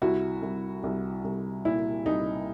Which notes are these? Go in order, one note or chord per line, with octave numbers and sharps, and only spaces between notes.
C2 E4 F#4
C2
C2
C2
A#2 E4
C2 D#4